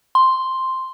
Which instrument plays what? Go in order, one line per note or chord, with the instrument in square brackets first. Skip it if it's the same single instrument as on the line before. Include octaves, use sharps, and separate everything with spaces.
[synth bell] C6